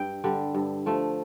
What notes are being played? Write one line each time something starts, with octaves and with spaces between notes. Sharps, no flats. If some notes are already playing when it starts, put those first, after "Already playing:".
Already playing: G2 G5
D3 G3
G2
F3 A3